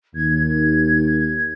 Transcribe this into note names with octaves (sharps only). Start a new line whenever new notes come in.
D#2 G#6